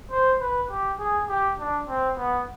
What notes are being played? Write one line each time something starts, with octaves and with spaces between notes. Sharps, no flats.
C5
B4
G4
G#4
G4
D4
C4
B3